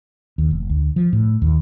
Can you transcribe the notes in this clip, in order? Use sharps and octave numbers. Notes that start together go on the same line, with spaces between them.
D#2
F1
D2
F3
A2
D#2